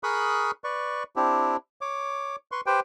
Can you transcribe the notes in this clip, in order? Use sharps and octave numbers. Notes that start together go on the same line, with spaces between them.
G#4 A#4 B5 C#6 D#6 F#6
B4 D5 C#6
C4 D4 E4 G4
C#5 D6
B4 C6 C#6
G4 B4 C5 G5